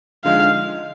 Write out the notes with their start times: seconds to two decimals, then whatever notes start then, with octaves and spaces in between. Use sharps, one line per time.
0.24 D3 F3 G#3 D#4 F5